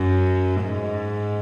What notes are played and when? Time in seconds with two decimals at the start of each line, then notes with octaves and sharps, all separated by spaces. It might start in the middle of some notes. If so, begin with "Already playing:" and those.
Already playing: F#2
0.63 G#2